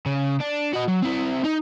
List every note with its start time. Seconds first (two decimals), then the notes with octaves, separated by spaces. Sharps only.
0.06 C#3
0.40 D4
0.73 F#4 D#5
0.88 F#3
1.02 C4 E4
1.44 D#4